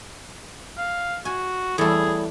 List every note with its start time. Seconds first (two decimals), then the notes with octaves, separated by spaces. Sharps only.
0.78 F5
1.25 F#4 G#5
1.78 E2 A2 G3 G#4 A4